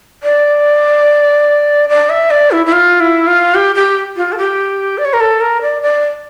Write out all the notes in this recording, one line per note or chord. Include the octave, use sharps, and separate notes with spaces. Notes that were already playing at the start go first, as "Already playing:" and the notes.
D5
D5
E5
D5
E4
E4
F4
E4
F4
G4
G4
F4
A4
G4
D5
C#5
A#4
A4
A#4
D5
D5